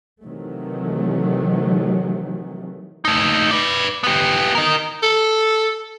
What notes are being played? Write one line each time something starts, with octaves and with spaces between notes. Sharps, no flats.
C3 D#3 E3 F#3 A3
A3 D#4
B4 D5
B3 G4
A#4 D#5
A4